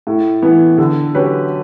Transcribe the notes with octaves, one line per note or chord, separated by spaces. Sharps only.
A2
E3 B3
D3
F#3 C#4 G4 B4